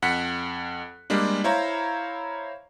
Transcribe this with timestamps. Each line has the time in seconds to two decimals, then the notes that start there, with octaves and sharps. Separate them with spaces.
0.02 F2 F#5 F#6 B6 C#7
1.10 G3 G#3 A#3 D4
1.44 E4 C5 C#5 F5 A#5